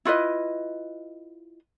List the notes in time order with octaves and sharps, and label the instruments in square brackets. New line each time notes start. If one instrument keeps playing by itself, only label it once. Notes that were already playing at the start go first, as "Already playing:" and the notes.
[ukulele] E4 F4 B4 D#5